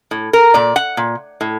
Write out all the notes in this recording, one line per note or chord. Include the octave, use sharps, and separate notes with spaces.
A2
A#4
A#2 D5
F#5
A#2
A2